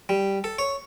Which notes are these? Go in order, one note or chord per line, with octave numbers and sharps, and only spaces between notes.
G3
A4
C#5